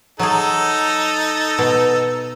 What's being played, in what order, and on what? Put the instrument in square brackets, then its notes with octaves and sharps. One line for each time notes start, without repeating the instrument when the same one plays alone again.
[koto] F#3 G#4 [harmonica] D#4 A4
[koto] B2